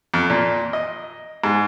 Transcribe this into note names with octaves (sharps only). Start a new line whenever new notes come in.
F2
A#2
D#5
G#2